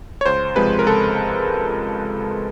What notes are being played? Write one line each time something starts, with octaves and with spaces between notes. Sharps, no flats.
C#5
C#2 C5
C3 F3 G#3 B4
A#4
C#2 A4